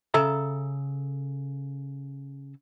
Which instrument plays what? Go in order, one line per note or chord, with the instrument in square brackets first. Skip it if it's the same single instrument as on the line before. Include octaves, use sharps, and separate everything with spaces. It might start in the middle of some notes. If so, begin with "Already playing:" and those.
[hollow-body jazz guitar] C#3 A4 E5 A#5